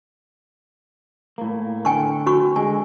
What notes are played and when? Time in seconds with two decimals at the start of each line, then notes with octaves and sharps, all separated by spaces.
1.38 A2 A#3
1.85 D3 G5 G#5 C#6
2.26 F#4 C#6
2.56 D3 G#3 G#5